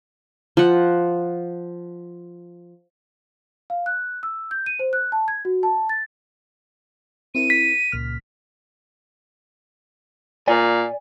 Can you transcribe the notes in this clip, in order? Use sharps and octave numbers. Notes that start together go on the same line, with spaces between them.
F3 F#5
F5
F#6
E6
G6
D#7
C5
F#6
A5
G#6
F#4
A5
A6
C4 E4 A#4 D#7
B6
C#2 A#2 F6
A#2 D5 G#5